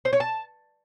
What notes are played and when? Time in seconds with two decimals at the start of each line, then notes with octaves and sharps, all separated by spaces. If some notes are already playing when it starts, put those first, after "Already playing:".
0.05 C5
0.13 C#5
0.20 A5